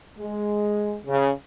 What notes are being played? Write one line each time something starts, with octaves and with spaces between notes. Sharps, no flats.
G#3
C#3